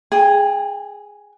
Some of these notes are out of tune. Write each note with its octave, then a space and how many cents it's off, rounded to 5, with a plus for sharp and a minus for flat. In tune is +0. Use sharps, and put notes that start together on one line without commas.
G#4 +0 G5 +25